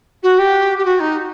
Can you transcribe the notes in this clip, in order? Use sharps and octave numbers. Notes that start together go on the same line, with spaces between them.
F#4
G4
G4
F#4
D#4